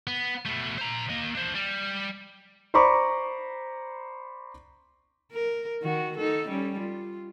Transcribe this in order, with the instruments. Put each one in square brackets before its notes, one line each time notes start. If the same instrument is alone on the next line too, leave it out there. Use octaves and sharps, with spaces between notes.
[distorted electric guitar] B3
B2 A3
C5 A#5
A#3 D#5
D4 C5
G3
[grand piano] C5 D5 A#5 B5 C#6 D6
[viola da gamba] A#4
D#3 F#4
D#4 A4
G3 C#4
F4